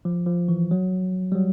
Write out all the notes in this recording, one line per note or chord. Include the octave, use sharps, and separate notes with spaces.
F3
F3
E3
F#3
G3
F#3